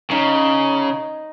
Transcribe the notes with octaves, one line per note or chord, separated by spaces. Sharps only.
C#3 D#4